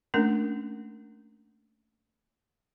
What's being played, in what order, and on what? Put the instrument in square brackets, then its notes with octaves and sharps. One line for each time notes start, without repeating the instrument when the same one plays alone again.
[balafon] A3 A#3 C#4 D4 A#4